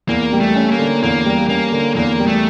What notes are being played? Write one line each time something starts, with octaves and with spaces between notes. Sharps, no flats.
E2 A#3
G3
A3
C#4
A#3
D3
E2 A#3
G3
A#3 C#4
D3
E2 A#3
G3
A3